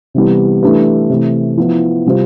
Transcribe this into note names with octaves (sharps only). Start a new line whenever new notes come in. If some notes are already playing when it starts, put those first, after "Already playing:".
C3 E3 G3 B3
E3 A3 D4 G4 B4
C3 E3 A3
F3 B3 E4
C3 G3 C4 F4